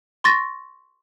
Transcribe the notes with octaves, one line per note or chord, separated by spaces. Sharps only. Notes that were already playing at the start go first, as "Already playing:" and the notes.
C6 C#6 A6 A#6